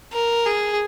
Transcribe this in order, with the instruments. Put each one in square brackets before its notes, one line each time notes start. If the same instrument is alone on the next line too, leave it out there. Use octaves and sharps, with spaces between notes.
[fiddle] A#4
G#4